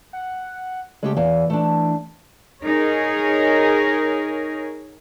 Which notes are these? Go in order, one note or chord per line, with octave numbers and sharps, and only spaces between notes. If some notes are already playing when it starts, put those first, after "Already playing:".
F#5
C#3 G#3 A3 G4
E2 E3 F5 G#5
A3 D4
D#4 G#4 A#4 C#5